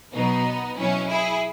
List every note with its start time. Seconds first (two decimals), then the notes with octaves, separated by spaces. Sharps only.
0.12 B2 F#3 B3 D#4
0.76 B2 F#3 C#4 E4
1.08 E4 G#4